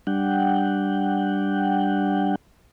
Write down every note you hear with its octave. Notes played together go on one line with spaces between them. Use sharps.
G3 D4 F#5 G5